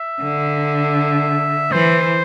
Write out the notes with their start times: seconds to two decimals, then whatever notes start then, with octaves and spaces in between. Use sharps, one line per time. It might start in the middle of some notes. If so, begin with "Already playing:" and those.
Already playing: E5
0.22 D3
1.71 E3 C5